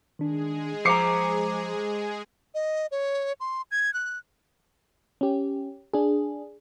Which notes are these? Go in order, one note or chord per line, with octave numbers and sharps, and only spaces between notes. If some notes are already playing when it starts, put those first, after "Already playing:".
D#3 G#3 D4 G#4
F3 C5 F5 A#5 D6 C7 C#7
D#5
C#5
C6
G#6
F#6
C#4 G4
D4 G#4